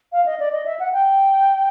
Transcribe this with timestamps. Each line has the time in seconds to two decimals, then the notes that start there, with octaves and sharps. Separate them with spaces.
0.12 F5
0.26 D#5
0.40 D5
0.52 D#5
0.66 E5
0.80 F#5
0.93 G5